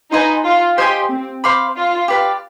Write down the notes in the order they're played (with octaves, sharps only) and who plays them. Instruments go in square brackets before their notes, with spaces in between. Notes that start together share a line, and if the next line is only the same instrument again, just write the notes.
[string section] D#4 [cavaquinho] F4 B4 D#5 G#5
[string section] F4
[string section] G4 [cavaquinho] C5 D#5 G#5 C6
[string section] C4
[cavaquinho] C5 F5 B5 D6
[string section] F4
[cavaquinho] G4 B4 D5 F5